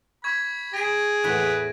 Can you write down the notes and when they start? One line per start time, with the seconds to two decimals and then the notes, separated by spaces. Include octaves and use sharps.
0.24 B5 C#6 G#6
0.73 G#4 A#6 D7
1.24 E2 A2 B4 C#5